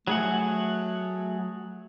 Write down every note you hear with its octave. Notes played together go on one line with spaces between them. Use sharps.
F#3 A3 G#4 F#5